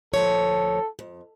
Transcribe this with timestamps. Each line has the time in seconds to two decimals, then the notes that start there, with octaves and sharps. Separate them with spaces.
0.14 D2 F3 A4 C#5
0.99 F2